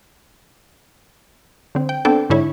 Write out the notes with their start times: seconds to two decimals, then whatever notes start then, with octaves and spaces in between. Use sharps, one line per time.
1.75 D3 C4
1.89 G5
2.05 B3 C4 D4 A4 G5
2.30 G#2 D3 E4 C#5